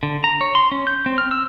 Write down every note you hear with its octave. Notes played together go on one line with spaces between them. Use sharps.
D3
A#5
C#5
C6
C#4
G6
C4
F6
E6